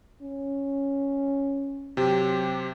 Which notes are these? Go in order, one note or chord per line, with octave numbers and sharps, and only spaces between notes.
C#4
C3 F#3 G4